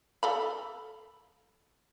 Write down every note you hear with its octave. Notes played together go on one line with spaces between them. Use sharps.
A4 F5 B5